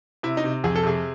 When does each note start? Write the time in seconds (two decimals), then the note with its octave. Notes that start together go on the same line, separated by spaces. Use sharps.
0.23 C3 E4
0.37 D#4
0.44 C3
0.64 F2 G#4
0.76 A4
0.83 C3 G#4